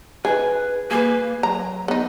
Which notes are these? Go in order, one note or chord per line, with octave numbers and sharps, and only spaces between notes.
D#3 G#4 B4
A#3 G#4 B4
F#3 A#5
B3 D#4